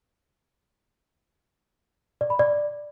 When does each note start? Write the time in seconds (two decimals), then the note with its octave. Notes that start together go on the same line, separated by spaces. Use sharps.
2.21 D5
2.30 B5
2.39 D5